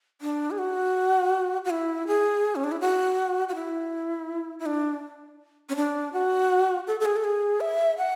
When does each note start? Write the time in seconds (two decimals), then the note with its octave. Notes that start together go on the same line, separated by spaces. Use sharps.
0.21 D4
0.51 G#4
0.58 F#4
1.65 F#4
1.70 E4
2.07 G#4
2.56 C#4
2.64 D4
2.72 E4
2.81 F#4
3.49 F#4
3.55 E4
4.59 E4
4.66 D4
5.69 C#4
5.76 D4
6.13 F#4
6.87 A4
7.00 A4
7.05 G#4
7.16 A4
7.24 G#4
7.61 E5
7.98 F#5